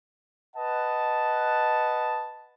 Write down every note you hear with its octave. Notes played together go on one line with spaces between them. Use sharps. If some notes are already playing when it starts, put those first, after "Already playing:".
B4 D#5 F#5 A5